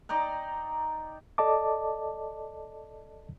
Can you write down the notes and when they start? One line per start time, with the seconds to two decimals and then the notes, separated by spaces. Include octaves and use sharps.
0.09 D#4 D5 G5 A#5
1.38 A4 D5 D#5 A5 D6